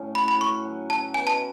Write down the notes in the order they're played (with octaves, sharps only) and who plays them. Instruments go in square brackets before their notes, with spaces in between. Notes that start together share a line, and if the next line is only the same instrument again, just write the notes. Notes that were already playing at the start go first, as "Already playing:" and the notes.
Already playing: [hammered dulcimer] A2 C#4
[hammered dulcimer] F#4 [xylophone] B5
[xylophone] B5
[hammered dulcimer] C#4 [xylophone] C#6
[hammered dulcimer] F#3
[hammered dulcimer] F#3 [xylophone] A5
[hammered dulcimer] B2 [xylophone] G#5
[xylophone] A5